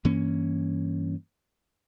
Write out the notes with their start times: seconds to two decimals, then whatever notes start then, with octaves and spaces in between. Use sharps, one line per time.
0.05 G2 E3 A#3 C#4